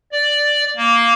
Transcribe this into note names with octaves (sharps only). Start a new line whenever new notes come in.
D5
A#3